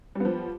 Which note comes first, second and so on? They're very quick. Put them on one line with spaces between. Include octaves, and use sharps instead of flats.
G3 B3 F3